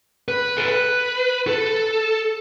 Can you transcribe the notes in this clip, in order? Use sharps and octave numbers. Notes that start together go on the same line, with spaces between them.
B4
A4
B4
A4